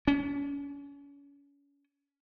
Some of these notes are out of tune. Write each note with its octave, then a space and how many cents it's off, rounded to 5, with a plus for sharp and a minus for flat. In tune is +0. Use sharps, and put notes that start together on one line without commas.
C#4 +35